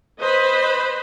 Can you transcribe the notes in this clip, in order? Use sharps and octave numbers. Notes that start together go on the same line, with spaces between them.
B4 C5 D#5 B5